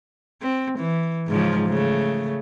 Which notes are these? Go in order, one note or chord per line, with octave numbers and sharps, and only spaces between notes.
C4
E3
G#2 C#3 F3
C#3 A3